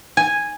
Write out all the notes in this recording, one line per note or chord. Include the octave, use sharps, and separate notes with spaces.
G#5